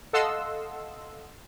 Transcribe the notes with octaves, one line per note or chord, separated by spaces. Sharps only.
A4 D#5 F5 F#5 C6 E6